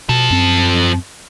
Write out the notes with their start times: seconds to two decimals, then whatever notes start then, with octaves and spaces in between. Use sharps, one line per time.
0.09 B2 F3 A4
0.30 F#2 C4